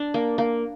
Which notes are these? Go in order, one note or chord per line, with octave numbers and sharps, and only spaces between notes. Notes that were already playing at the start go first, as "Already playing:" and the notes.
Already playing: D4
A#3
A#3